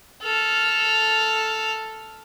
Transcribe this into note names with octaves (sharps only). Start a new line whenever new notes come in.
A4 F6